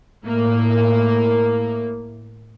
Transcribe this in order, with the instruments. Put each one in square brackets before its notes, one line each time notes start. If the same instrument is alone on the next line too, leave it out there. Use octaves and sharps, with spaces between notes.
[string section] A2 A#3